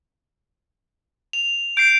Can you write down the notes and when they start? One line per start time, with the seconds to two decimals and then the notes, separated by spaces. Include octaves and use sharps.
1.33 F7
1.77 G6 C7 D7